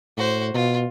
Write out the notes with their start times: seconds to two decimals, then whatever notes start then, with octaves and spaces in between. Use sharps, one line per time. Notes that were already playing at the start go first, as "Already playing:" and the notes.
0.17 A2 F#4 C5
0.54 B2 F4